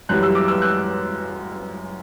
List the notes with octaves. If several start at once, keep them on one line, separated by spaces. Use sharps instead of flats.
F#2 E3 G3 F#6
E6
D6
E6
F#6